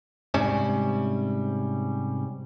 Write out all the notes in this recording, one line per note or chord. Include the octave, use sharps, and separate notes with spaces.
G#2 C3 G3 C#4